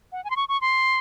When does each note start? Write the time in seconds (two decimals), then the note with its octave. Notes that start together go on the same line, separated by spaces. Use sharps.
0.12 F#5
0.24 G#5
0.30 C6
0.36 C#6
0.49 C#6
0.61 C6